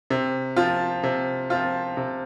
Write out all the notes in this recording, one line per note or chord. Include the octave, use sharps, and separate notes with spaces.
C3
F3 C4 F4
C3
F3 C4 F4
C3